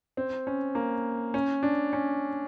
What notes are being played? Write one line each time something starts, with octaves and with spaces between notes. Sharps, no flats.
C4
C#4
A#3
C#4
D4
C#4